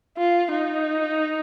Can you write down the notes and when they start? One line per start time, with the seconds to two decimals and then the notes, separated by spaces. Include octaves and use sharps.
0.18 F4
0.51 D#4